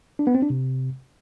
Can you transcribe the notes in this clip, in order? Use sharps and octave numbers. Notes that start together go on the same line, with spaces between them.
D4
B3
C4
D4
C3